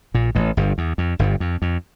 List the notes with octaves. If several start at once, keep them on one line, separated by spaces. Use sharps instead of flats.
A#1 A#2
A1 A2
G1 G2
E2
F2
G1 G2
F2
F2